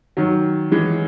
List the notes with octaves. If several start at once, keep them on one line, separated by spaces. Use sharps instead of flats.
D#3 F#3
E3 G#3